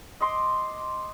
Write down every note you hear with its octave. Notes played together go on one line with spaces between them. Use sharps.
D#5 C6 D6